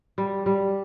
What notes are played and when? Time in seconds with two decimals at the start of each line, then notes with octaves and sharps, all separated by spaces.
0.18 G3
0.46 G3